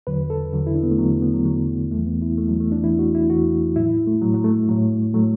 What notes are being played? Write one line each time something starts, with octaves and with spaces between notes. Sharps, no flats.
E2 D3 F#3 B4
A4
E2 D3 F#3
E4
D4
B3
A3
E2 D3 F#3
B3
F#3
E2 D3 F#3
E2 E3 A3
B3
E4
E2 E3 A3
F#3
A3
D4
E2 E3 E4
F#4
E4
E2 E3 F#4
A2 F#3 E4
A3
A2 F#3
F#3
A3
A2 F#3
A2 F#3 A3